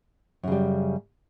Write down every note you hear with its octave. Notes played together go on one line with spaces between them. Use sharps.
F#2 C#3 G3